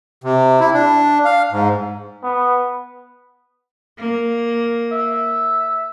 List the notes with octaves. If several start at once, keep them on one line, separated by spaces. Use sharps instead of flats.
C3
E4
D4
F5
G#2
B3
A#3
E5